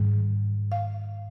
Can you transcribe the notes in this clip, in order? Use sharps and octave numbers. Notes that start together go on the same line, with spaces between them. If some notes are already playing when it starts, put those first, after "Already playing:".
Already playing: G#2 D#3 G3
F5